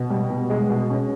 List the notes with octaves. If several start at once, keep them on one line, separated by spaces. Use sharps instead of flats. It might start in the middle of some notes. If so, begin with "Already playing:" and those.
Already playing: B2
G3
B2
G#3
B2
C#4